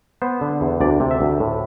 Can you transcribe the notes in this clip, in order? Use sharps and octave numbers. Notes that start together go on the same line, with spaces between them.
B3 C5
D3
E2
D2 D5
C3
E5
D2
A2